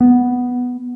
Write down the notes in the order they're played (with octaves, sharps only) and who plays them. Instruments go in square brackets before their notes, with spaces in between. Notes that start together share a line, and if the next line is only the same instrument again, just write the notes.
[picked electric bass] B3